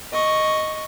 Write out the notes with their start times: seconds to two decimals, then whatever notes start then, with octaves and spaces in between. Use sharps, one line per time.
0.13 D#5 C#6